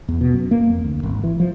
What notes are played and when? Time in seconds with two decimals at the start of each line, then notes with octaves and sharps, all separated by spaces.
0.08 E2
0.21 B2
0.34 F#2
0.51 A#3
0.70 F2
0.84 D2
1.03 G#1
1.24 E3
1.40 F3